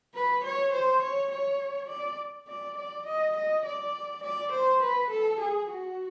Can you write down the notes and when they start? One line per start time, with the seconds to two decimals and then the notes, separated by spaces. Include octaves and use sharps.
0.15 B4
0.44 C#5
0.73 C5
1.03 C#5
1.31 C#5
1.89 D5
2.48 D5
2.78 D5
3.06 D#5
3.36 D#5
3.66 D5
4.24 D5
4.52 C5
4.82 B4
5.11 A4
5.41 G#4
5.70 F#4